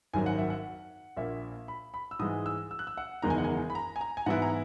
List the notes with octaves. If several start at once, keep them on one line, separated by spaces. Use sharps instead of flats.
G#1 F#2 D#3 F#3 G#5
F#5
E5
F#5
A#1 A#2 A#3 E5
B5
B5
E6
G#2 E3 G#3 D#6
E6
E6
F#6
E6
F#5
F#1 E2 D#3 G#3 A#5
G#5
F#5
G#5
B5
A#5
G#5
A#5
G#5
G#2 E3 B3 E4 F#5
A#5